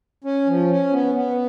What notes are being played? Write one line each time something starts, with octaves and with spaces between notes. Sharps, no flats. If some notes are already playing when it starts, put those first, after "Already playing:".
C#4
F3
C#4
B3
B3